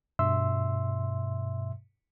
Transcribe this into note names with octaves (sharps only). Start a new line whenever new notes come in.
G2 B2 E5 C6 E6